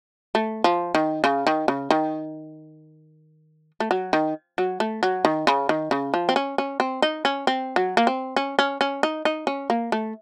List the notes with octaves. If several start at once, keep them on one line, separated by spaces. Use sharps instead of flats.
A3
F3
D#3
C#3
D#3
C#3
D#3
A3
F#3
D#3
F#3
A3
F#3
D#3
C#3
D#3
C#3
F3
C4
C#4
C#4
C4
D#4
C#4
C4
F#3
A#3
C4
C#4
C#4
C#4
D#4
D#4
C#4
A#3
A3